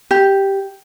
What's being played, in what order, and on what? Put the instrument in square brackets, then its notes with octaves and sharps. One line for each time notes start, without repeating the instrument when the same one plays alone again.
[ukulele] G4